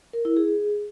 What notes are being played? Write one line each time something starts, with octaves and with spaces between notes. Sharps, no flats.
A#4
E4
G#4